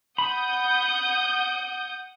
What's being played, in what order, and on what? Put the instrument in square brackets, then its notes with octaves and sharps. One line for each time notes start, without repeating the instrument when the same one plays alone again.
[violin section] F#5 D#6 G6 [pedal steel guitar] B5